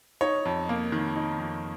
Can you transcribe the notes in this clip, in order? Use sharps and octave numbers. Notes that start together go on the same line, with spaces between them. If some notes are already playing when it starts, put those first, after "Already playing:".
D#4 C#5
F2
A#3
D#3
D#4
F2